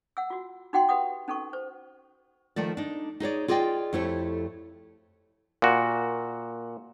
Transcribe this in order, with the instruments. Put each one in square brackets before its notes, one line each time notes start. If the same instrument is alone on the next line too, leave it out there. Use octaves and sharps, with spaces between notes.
[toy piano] F#5 E6
F4 F#4
D#4 F#4 F#5 G5 C6
G4 B4 F#5 D#6
C#4 D#4 A4 A#4 C#6
C5
[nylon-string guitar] D#3 F3 A3 D5
D4 D#4
D#4 G#4 C#5 D5
F4 G#4 D5 D#5 G5
F2 A3 E4 G4 C#5
[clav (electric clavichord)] A#2 F#4